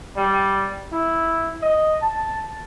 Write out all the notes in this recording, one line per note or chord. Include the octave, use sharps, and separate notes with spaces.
G3
E4
D#5
A5